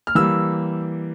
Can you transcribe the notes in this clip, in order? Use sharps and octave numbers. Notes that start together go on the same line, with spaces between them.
F6
E3 G3 A#3 E6